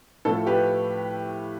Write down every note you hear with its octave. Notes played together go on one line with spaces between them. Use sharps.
A2 F3 A3 A4
G4 B4